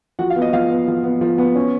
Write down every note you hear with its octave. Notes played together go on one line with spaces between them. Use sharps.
F3 F#4 F#5
F5
B3
D#5
F3 F5
B3
F3
B3
F3
B3
C#4